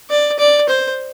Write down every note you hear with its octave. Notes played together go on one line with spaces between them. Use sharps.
D5
D5
C5